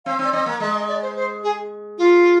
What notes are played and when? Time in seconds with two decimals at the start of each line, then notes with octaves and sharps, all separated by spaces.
0.06 C4 F5
0.19 C4
0.24 D5
0.32 C4 D#5
0.46 A#3
0.60 G#3 D#5
0.75 D#5
0.88 D5
1.02 C5
1.16 C5
1.44 G#4
1.98 F4